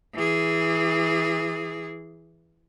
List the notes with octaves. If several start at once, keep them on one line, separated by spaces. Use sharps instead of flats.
E3 G#4